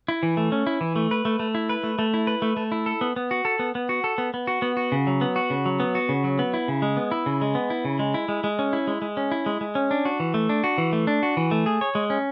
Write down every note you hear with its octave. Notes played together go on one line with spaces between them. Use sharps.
E4
E3
A3
C#4
E4
E3
A3
B4
A3
A3
E4
B4
A3
A3
E4
B4
A3
A3
E4
A4
B3
B3
F#4
A4
B3
B3
F#4
A4
B3
B3
F#4
B3
F#4
C#3
F#3
B3
F#4
C#3
F#3
B3
F#4
C#3
F#3
B3
E4
C#3
G#3
B3
E4
C#3
G#3
B3
E4
C#3
G#3
E4
G#3
G#3
C#4
E4
G#3
G#3
C#4
E4
G#3
G#3
C#4
D4
F#4
E3
A3
D4
F#4
E3
A3
D4
F#4
E3
A3
G#4
C#5
G#3
C#4